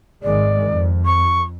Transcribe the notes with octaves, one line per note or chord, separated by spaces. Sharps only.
G#1 D#3 G#3 D5
F2
C#6